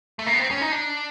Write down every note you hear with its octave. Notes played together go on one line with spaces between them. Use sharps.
A3
A#3
B3
C4
C#4
D#4
D4